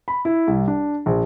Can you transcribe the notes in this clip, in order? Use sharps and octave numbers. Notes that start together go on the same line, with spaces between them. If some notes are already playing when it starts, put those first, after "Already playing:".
B5
E4
C2
D4
A#1